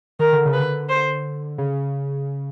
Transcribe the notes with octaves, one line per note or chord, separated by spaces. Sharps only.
D#3 A#4
D3
C#3
B4
D3
C5
C#3